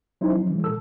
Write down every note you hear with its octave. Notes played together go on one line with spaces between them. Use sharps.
F#3 C#4 D#4 E4 C5
F3 F#3 C#4
E3 G#3
A#2 A4 E6